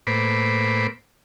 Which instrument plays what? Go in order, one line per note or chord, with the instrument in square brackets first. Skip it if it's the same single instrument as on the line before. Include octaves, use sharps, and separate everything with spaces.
[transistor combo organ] A2 A#3 B4 C5 B5 D6